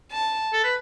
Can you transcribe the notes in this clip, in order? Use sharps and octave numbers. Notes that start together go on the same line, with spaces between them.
A5
A4
B4